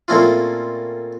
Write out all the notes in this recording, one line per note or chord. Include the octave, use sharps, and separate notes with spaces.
A#2 A3 C4 C#4 E4 F4